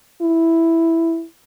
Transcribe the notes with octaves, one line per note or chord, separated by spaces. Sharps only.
E4